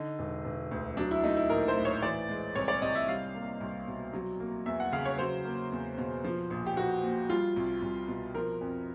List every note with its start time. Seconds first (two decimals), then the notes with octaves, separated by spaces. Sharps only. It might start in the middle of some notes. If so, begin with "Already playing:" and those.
Already playing: D3 D#4
0.19 E1
0.45 E1
0.71 D2
0.97 F#3 D4
1.11 E4
1.24 A3 D#4
1.37 E4
1.50 A#1 A#4
1.68 C5
1.76 A2
1.85 C#5
2.02 E3 D5
2.29 G#3
2.55 C2 C#5
2.68 D5
2.81 C3 D#5
2.95 E5
3.08 G3 F5
3.35 A#3
3.61 C2
3.87 B2
4.13 F#3
4.40 A#3
4.66 E2 E5
4.80 F#5
4.92 C#3 F5
5.05 C#5
5.19 F#3 C5
5.45 A#3
5.72 E2
5.98 B2
6.24 F3
6.50 A#1
6.66 G4
6.77 A#1 F#4
7.03 A#2
7.29 G3 F4
7.56 C2
7.82 C2
8.08 B2
8.35 F3 A#4
8.61 F2